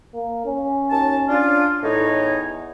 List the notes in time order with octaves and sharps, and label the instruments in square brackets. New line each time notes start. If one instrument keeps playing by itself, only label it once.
[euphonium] A#3
C#4
[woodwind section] D#2 A5
D4 F4
[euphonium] E2 [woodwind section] A2 D#4 C#5